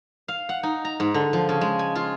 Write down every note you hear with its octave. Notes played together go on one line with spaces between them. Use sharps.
F5
F#5
D#4
A#5
G#2
D3
F3
C#3
G#3
G#5
F4